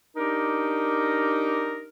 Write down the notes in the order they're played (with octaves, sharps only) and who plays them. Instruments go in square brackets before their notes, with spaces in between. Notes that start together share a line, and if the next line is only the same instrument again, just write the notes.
[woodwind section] D4 D#4 G4 A#4